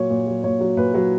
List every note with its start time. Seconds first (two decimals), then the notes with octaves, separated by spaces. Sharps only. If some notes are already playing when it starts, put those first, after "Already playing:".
Already playing: A#2 F#3 C#5
0.10 A#2
0.27 F#3
0.44 A#2 C#5
0.60 F#3
0.77 A#2 B4
0.94 F#3